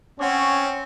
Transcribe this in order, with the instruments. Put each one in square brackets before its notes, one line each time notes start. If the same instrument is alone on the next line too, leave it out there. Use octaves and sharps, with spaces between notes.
[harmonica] C4 [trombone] C#4 [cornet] C#5 [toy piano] F#5 C#6 D6